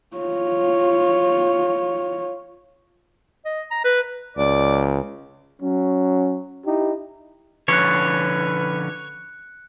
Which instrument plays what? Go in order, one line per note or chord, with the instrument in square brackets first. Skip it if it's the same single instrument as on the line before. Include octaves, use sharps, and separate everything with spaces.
[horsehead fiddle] F4 C#5
[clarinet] D#5
A#5
B4
[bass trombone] C#2 [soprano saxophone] D5
[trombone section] F#3 C#4
D#4 E4 G4
[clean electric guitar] D3 F3 C#4 [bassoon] B4 [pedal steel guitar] C#5 [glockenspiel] F#6 C#7